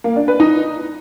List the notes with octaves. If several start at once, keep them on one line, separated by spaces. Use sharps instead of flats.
A#3
D4
B4
D#4